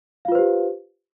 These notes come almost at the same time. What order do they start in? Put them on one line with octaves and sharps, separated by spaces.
F5 F4 B4 C5 G4